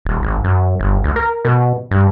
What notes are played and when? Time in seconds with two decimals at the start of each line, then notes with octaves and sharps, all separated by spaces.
0.05 D#1
0.23 G#1
0.44 F#2
0.80 G1
1.04 D2
1.16 A#4
1.45 B2
1.91 G2